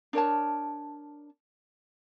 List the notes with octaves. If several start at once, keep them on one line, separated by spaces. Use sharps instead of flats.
D4 A#4 C#5 A5